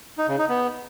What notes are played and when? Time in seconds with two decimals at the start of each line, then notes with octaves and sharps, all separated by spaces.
0.18 D#4
0.28 C#3
0.39 D#4
0.49 B3